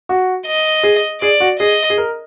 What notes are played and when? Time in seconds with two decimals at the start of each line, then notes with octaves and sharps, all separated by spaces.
0.09 F#4
0.46 D#5
0.83 G#4
1.21 G#4 D5
1.40 F#4
1.59 G#4 D#5
1.90 G#4
1.98 A#4